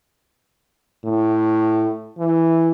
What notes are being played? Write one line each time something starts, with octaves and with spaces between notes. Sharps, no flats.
A2
E3